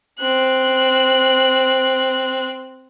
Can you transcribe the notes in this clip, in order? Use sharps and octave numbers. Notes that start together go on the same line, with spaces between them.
C4 F#6